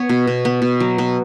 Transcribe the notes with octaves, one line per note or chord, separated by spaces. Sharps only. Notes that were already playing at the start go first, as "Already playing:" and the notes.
Already playing: B3 C#5
B2
B2
B3
B2
F#3
B2